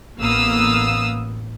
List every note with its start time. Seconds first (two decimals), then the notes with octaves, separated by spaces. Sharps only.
0.18 A1 A#3 B3 F5 D#6 E6